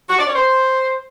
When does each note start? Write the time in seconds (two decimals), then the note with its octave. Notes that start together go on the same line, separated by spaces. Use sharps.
0.10 F#4
0.18 D5
0.27 C#5
0.36 C5